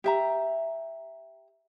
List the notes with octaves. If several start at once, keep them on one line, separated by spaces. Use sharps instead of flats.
G4 E5 A#5